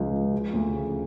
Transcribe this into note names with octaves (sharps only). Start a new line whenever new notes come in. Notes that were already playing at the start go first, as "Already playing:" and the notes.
Already playing: C#2 F3
C#3
F3
D2
C#3